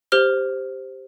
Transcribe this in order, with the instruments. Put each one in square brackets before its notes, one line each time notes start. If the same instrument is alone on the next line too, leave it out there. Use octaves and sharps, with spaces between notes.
[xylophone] G4 C5 F6 G7